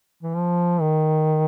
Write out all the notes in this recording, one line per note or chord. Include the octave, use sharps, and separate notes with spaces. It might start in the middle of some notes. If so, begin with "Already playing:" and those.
E3
F3
D#3